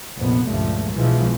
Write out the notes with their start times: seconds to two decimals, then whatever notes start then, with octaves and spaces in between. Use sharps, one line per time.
0.18 A#1 F2 C3 B3
0.48 C#2 G2 A#2 F3 A3
0.94 B1 B2 E3 F3 G#3